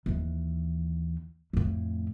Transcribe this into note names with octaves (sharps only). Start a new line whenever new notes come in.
D#2 E3
F2 A2